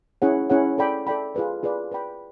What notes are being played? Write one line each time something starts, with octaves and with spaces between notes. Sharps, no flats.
C#4 E4 G#4 C#5 F#5
C#4 E4 G#4 C#5 F#5
A4 D5 G5 B5
A4 D5 G5 B5
F4 G#4 B4 D5
F4 G#4 B4 D5
B4 D5 G5 B5